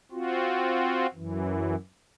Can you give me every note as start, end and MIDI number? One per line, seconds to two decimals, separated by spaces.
0.12 1.07 60
0.12 1.07 65
0.12 1.07 66
1.14 1.75 42
1.14 1.75 52